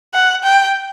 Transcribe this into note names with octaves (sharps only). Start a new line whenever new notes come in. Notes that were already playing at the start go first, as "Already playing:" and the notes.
F#5
G5